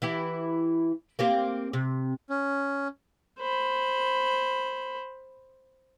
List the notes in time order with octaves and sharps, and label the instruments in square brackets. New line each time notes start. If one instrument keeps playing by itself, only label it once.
[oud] E3 E4 G4
A#3 C4 G4
C3
[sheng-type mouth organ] C#4
[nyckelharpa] C5 B5